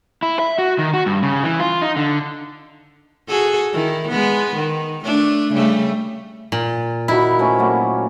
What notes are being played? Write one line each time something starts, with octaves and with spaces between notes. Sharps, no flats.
E4
E5
F#4
D#3
F#4
G2
C#3
E3
F4
D#4
D3
F#4 G#4 A4
D#3 E4
G#3 B3
D#3
A3 D4
C#3 G3 A3
A#2
D#3 E4 F#4 F5 A#5 B5
C3 A3 C#4
F#3 A3 A#3